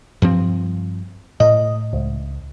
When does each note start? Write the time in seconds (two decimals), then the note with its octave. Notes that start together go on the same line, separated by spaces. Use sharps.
0.22 G2 F3 C4
1.40 A2 D#5
1.93 C#2